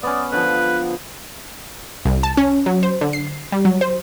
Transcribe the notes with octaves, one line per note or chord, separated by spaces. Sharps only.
B3 C#4 D5
D3 F3 B4
C2
A5
C#4
F#3
C5
D3
C7
G3
F#3
C5